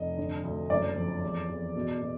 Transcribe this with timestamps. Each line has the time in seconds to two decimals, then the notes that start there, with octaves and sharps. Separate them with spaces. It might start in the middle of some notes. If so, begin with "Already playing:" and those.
Already playing: F1 D#5
0.17 D3
0.44 D2
0.70 F#1 D5
0.97 F2
1.23 E2
1.49 E2
1.76 B2
2.02 B2